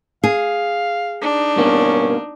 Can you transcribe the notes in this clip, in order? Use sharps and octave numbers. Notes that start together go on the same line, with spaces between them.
G#4 F5
D4 D#4
G2 B2 A#3 C#4